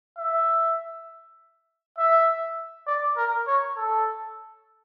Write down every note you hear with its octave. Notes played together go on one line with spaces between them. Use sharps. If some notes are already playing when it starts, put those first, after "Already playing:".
E5
E5
D5
A#4
C#5
A4